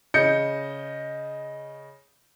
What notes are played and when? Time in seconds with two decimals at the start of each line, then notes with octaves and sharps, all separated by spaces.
0.14 C#3 D#5 G6 C#7